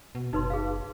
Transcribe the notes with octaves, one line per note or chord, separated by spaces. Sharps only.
B2
F#1 D#4 B4 C6
G#4 B4 F5